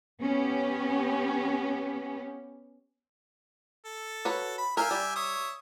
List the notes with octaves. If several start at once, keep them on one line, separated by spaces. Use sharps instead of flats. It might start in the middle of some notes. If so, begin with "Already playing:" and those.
B3 C#4 G4
A4
F#4 B4 C#5
B5
A#4 E5 F5 G5 G#5
G3
C#5 E5 D#6